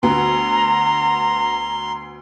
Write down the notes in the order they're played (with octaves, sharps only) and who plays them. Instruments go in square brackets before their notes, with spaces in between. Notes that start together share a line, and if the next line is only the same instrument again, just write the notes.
[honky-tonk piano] D2 B3 F#4 [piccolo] A#5 [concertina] C6